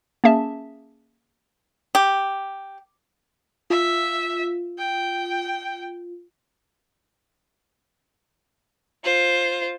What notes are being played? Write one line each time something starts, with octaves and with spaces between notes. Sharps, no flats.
A#3 C#4 G#4 E5 A5
G4
F4 E5
G5
F4 C5